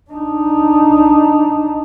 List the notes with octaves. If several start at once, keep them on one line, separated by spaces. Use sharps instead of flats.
D4 D#4